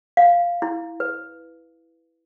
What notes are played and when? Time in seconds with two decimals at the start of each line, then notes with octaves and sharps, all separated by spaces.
0.17 F5
0.62 E4
1.00 B4